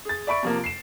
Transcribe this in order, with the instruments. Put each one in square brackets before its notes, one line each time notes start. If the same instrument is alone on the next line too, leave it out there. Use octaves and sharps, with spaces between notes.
[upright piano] G#4 A6
D5 E5 B5 C#6 D7
C3 F3 A#3
C7 E7